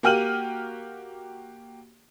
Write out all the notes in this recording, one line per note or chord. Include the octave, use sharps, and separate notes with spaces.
A#3 F#4 G4 F6 D#7 F#7